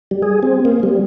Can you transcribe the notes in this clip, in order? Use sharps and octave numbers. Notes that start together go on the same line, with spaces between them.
G3
G#4
C4
A#3
G3